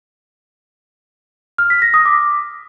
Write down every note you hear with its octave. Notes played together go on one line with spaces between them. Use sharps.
F6
B6
A#6
D#6
D6